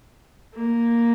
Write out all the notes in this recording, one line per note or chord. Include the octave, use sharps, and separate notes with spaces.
A#3